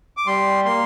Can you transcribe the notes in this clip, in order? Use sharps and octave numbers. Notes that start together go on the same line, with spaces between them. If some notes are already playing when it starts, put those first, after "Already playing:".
D6
G3 C6
A#3 C6